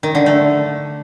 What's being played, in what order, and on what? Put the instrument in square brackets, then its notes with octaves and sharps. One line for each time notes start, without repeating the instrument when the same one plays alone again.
[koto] D#3
D3
A3